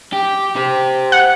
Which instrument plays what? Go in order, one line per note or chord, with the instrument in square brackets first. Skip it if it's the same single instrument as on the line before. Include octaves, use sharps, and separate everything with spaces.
[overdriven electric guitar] G4
G4 C5
[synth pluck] F#5